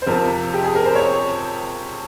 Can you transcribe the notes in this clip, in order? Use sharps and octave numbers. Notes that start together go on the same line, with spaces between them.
C5
F2 C3 F3 C4 A#4
G4
G#4
A#4
C5
C#5